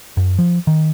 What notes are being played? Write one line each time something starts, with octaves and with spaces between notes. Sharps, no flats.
F#2
F3
D#3